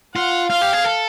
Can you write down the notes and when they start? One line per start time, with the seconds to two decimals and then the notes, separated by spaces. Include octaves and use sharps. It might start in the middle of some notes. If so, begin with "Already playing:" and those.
0.15 F4 F#5
0.50 F4 F5
0.61 G4
0.73 G#4
0.84 A4